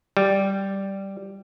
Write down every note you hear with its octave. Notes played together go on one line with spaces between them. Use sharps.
G3